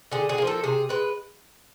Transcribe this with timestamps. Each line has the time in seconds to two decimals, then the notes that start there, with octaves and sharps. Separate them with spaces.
0.12 D3 G#4
0.29 G#4
0.38 F3 A#3
0.47 A4
0.64 C3 G#4
0.89 G#3 B4